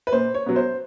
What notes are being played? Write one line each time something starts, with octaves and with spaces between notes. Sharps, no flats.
B4
A#2 C5
C#5
F#3 B3
C5